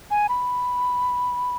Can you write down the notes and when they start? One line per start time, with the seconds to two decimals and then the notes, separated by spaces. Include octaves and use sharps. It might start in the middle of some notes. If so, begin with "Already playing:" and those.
0.11 G#5
0.29 B5